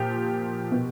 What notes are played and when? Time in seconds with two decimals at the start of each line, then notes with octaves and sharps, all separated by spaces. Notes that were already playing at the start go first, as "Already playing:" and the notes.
Already playing: A#2 F3 G4
0.72 B2